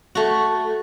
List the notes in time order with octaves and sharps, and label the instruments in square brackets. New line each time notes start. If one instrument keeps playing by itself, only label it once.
[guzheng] A3 F#4